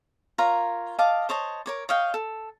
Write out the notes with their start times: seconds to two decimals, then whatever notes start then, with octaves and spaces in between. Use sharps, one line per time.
0.38 F4 A#4 C#5 A#5
0.98 D#5 F5 A5 D6
1.29 C5 C#5 D#5 A5
1.66 A#4 C#5 D6
1.89 C#5 D#5 F5 G5
2.14 A4